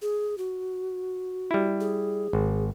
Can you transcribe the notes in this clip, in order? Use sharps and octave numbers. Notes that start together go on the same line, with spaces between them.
G#4
F#4
G3 E4
G#4
G#1